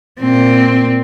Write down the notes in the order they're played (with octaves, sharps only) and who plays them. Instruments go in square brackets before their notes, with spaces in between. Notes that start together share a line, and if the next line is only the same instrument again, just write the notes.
[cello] A#2 C4